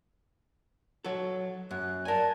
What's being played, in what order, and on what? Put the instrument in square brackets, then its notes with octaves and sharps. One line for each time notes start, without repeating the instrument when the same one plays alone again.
[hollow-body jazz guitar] F#3 A4
[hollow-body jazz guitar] F#2 [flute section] F#6
[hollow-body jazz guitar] A#4 G#5 [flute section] D5 A5 G#6